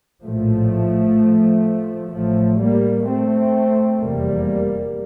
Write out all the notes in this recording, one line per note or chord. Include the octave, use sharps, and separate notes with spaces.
A#1 A2 F3 A3
A1 A2 F3 A3
G3 A#3
A3 C4
F1 E2 C3 G3 A#3